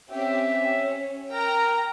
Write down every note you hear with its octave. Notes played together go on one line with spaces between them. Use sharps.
C4 C#4 G4 E5
C#4
A#4 G5 A#5